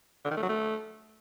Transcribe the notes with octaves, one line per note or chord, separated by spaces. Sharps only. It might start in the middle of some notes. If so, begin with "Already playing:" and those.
D3
D#3
A3
F#3
A3